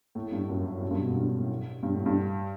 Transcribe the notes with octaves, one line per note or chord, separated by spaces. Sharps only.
A2
G2
F#2
F#2
G2
B2
A2
G2
A2
G2
A2
G2